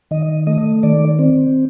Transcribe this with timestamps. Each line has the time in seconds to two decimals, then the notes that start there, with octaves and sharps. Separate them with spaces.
0.11 D#3 D#5
0.47 A3 D#5
0.83 D#3 D5
1.19 C4